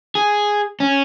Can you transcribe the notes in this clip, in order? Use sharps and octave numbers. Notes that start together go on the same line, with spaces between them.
G#4
C#4